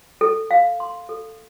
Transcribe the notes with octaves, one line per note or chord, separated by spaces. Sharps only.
A4
F5
C6
A4